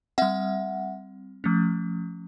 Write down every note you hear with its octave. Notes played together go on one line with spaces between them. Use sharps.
G3 C4 E5 F#5
F3 A3 C#4